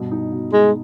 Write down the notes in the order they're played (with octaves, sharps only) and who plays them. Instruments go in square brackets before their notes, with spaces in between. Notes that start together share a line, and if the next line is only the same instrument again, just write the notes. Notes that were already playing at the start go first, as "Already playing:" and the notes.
Already playing: [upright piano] G2 B2
D#4
B2
[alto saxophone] G#3 [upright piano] D#4